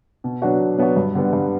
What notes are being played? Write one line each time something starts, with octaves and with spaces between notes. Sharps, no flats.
B2
F#3 B3 D4 F#4
B2
F#3 B3 D4 F#4
G2
D3 G3 B3
G2